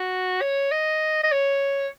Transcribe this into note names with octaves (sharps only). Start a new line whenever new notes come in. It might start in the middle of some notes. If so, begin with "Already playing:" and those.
Already playing: F#4
C#5
D#5
D#5
C#5